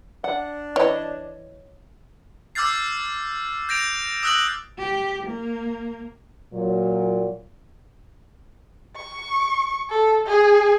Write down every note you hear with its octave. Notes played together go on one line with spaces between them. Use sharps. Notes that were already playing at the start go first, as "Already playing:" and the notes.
D4 F#5
E3 C#5 D#5
D6 E6 F6 G6 A6 C7
G6 A#6 D7 F7
D#6 E6 F#6 A#6 F#7
G4
A#3
A#2 F#3
C#6
A4
G#4